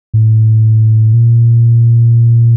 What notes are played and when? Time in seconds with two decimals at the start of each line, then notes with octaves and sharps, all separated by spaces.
0.14 A2
1.14 A#2